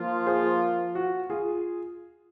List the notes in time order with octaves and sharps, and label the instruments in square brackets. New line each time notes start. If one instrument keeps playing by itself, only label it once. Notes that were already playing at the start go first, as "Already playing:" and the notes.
Already playing: [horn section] F3 A#3 F4
[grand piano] G#4 C5
F#4
F4 G#4